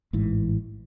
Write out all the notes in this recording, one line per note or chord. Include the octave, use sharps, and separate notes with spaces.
A1 G#2 E3